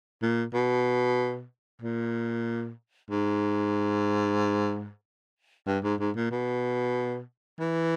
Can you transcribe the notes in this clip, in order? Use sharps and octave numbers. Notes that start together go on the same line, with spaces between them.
A#2
B2
A#2
G#2
G2
G#2
G#2
A#2
B2
E3